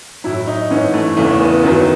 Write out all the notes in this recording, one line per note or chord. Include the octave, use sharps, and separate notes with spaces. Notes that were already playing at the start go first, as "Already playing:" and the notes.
A2 F#3 E4
D#4
G#2 E3 C#4
A3
E2 C#3 E3 A3
B3
F#2 D#3 F#3 B3